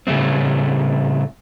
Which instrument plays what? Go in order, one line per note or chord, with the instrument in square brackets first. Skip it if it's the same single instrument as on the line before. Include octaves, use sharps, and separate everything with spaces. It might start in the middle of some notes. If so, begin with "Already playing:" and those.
[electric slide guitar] A2 C#3 G3 A3 C4